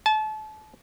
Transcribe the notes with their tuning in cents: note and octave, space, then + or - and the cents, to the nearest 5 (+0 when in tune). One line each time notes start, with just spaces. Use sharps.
A5 -30